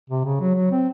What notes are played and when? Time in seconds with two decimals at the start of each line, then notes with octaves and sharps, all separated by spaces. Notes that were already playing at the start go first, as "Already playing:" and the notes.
0.10 C3
0.24 C#3
0.40 F#3
0.55 F#3
0.72 C4